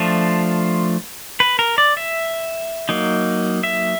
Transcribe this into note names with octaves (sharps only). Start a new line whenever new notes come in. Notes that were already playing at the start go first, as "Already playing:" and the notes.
Already playing: F3 A3 D4 F4
B4
A#4
D5
E5
F#3 A#3 D#4
E5